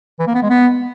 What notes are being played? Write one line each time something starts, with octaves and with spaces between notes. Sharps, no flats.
E3
A#3
B3
G#3
B3